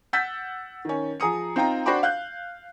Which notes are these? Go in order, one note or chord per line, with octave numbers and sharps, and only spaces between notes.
F#5 E6 G6 A6 B6
D#3 C#4
F3 G#4 A#5 D#6 C#7
C4 D#4 F4 G5 A#5
D4 F#4 C5 G5 B5 D6
F5 F#6 G6